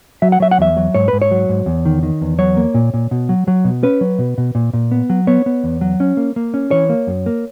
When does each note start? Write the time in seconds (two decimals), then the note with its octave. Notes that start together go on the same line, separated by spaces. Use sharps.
0.22 F#3 E5
0.32 F#5
0.40 F#3 E5
0.51 F#5
0.58 E2 E5
0.77 F#3
0.94 G#2 C#5
1.08 B4
1.13 G#2
1.22 C#5
1.31 F#3
1.49 G#2
1.66 E2
1.85 D#3
2.03 D#3
2.21 E2
2.38 F#3 C#5
2.57 A#3
2.74 A#2
2.94 A#2
3.11 B2
3.29 F#3
3.48 F#3
3.65 B2
3.83 C#4 B4
4.01 F#3
4.19 B2
4.38 B2
4.55 A#2
4.73 A#2
4.91 B3
5.10 F#3
5.27 B3 C#5
5.46 B3
5.64 E2
5.81 F#3
6.00 C#4
6.17 A#3
6.36 A#3
6.54 C#4
6.71 E3 C#5
6.89 A#3
7.07 F#2
7.26 A#3